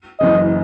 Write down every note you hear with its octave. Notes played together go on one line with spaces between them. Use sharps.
F#1 F#2 C#3 E3 D#5